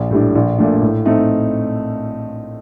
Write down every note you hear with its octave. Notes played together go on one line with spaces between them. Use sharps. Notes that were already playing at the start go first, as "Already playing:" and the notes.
Already playing: A#1
A2 G3 D4
A#1
A#2 A3 D4
A2
A3 C4 D#4